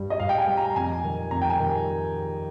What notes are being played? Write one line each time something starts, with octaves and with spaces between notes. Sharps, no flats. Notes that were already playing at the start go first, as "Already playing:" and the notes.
Already playing: G2 G3
D#5
G2 F5
G5
G#5
G3
A#5
F2 G#5
D#3 G3
F2 A#5
G5
G#5
D#3 G3